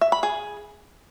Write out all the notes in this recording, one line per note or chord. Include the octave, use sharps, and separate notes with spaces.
E5
B5
G#4